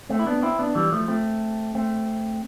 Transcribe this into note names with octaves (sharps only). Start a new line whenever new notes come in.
A3 C4
E4
B3 D4
C4 E4
B3 D4
E3 G3
F3 A3
A3 C4
A3 C4